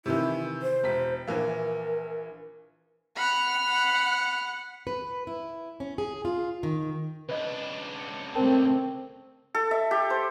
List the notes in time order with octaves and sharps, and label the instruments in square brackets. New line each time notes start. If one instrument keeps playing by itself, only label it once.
[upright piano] C3 D#3 E3 [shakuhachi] E4
[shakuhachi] C5
[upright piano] E1 B6
[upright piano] A#1 E3 A#3 [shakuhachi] A#4
[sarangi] F#5 [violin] B5 F6
[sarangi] F#5
[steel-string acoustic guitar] B4
E4
C#4
G#4
F4
D#3
[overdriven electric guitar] C#2 D4 [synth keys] B4 D#5
[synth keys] C#7
[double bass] A3 C4 [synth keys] A#4 G5 A5
[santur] A4
E5
G4
C5